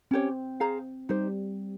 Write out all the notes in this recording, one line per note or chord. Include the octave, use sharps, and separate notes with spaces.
C4 C#4 G4 C#5
G#4 C5 F5 A#5
G3 D#4 G4 C5